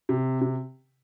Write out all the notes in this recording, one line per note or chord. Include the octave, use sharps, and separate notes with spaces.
C3
C3